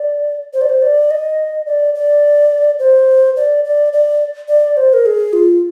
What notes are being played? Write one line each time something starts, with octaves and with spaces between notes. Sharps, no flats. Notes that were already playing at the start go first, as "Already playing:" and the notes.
Already playing: D5
C5
D5
C5
D5
D#5
D5
D5
C5
D5
D5
D5
D5
C5
A#4
G#4
F4